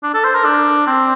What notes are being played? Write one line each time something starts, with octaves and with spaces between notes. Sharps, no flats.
D4
A4
C5
A#4
D4
C4